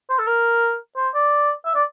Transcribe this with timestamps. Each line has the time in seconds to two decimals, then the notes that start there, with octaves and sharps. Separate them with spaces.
0.10 C5
0.19 A4
0.27 A#4
0.96 C5
1.15 D5
1.65 E5
1.75 D5